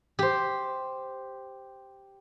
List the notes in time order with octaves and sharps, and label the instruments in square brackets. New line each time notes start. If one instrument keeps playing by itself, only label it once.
[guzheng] G4 C5